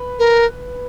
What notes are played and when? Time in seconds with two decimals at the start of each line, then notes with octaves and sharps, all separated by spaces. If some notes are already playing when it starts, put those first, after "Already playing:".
Already playing: B4
0.19 A#4